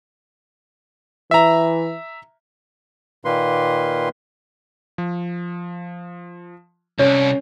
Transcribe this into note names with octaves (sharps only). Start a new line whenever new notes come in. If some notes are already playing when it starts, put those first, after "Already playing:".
E3 E5 A#5
A#2 D#3 A#3 B4 C6
F3
C2 C#4 C#5